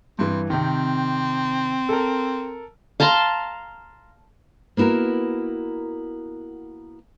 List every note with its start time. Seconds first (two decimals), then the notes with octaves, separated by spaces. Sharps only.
0.19 G2 E3 C4
0.50 C3 D#3 C4
1.89 A4 A#4
3.00 F5 A5 A#5 C6
4.77 A#3 B3 E4 F#4 A#4